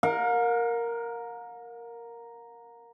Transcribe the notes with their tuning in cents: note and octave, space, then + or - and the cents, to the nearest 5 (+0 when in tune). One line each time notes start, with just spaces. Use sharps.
A#4 +0 F5 +45